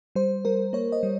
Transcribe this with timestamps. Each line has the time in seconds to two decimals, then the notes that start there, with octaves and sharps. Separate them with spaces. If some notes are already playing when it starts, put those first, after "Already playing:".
0.15 G3 C5
0.45 G3 A#4
0.73 A#3 C#5
0.92 D#5
1.03 G3